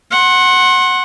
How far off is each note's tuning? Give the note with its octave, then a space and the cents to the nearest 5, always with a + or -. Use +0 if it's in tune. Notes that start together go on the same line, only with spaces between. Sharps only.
F#5 +0 C6 +35